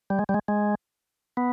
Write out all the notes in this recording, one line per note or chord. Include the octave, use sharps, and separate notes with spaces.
G3
G#3
G3
G#3
G#3
B3